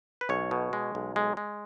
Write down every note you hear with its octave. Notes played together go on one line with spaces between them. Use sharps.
B4
B1 C#5
B2
G#3
B1
G#3
G#3